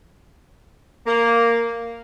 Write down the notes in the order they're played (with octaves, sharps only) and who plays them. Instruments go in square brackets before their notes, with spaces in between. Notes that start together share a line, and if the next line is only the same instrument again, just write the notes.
[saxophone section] A#3